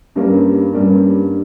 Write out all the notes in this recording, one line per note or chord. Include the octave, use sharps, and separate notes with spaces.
G2 G3 A#3 C#4
G2 G3 A#3 C#4